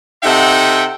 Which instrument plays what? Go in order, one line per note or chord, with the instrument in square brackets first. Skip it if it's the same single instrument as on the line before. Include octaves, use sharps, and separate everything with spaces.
[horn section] C3 D#4 A4 E5 F#5 G5